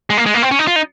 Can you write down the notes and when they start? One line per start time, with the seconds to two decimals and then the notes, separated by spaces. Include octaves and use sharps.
0.10 G#3
0.17 A#3
0.26 G#3
0.34 A#3
0.42 C4
0.51 C#4
0.59 D#4
0.67 F4
0.76 D#4